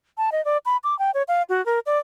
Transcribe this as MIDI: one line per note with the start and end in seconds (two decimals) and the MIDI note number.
0.18 0.30 81
0.32 0.43 75
0.45 0.58 74
0.66 0.77 83
0.84 0.97 86
0.99 1.11 79
1.14 1.23 73
1.28 1.43 77
1.49 1.64 66
1.66 1.79 70
1.86 1.99 74